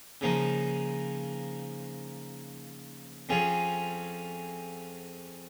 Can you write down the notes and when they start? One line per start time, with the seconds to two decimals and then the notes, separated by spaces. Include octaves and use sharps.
0.21 C#3 F3 A#3 D#4
3.29 F2 F3 C#4 F4 G#4